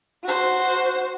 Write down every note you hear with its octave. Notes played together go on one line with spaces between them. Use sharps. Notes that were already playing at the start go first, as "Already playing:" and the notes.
F#4 C5